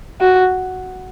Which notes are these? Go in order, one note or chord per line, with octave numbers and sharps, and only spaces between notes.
F#4